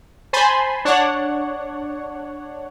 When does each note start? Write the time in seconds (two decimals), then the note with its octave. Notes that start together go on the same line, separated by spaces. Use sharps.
0.33 C5 G#5 A5 B5 C6
0.85 D4 C#5 F#5